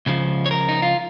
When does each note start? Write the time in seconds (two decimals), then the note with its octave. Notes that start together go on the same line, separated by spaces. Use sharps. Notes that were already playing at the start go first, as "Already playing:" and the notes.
0.06 C#2 C#3 F3
0.46 C#5
0.51 A#4
0.69 D#4
0.82 F4